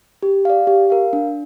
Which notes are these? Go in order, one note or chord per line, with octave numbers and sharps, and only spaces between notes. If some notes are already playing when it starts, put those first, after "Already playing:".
G4
D5 F5
G4
A#4 F5
D4